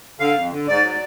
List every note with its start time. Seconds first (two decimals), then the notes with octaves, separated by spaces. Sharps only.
0.20 D3 F5
0.35 F2
0.51 D3
0.68 G#2 D5
0.84 F#3